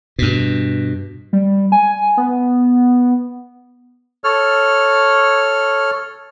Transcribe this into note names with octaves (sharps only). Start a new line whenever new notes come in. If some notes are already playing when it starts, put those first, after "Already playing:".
G2 B2
G3
G#5
B3
A4 C#5 F6